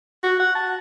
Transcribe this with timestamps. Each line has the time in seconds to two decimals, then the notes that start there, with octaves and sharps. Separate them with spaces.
0.24 F#4
0.40 F#5
0.55 A5